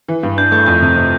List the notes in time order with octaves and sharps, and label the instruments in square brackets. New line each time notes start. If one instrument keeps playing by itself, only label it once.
[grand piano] E3
G2
[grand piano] D4 [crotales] G6
[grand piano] A3 [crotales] G6
[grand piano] F2 [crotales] G6
[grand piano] C3
C3